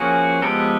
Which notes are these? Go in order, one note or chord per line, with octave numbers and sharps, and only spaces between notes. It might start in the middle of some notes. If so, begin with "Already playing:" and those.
Already playing: F3 A#3 C#4 F#4 G#4
F3 G#3 B3 G4 A4